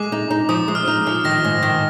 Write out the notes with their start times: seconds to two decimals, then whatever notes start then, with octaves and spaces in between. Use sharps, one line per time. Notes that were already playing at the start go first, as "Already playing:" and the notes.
Already playing: G#3 D6
0.12 D#4
0.30 D#4
0.49 F3 D#6
0.68 G#3
0.75 F6
0.87 D#4
1.07 F3
1.24 D#3 A#6
1.44 G#2
1.63 D#3